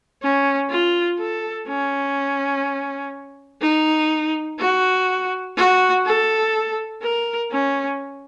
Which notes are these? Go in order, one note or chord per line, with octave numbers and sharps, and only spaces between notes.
C#4
F4
A4
C#4
D#4
F#4
F#4
A4
A#4
C#4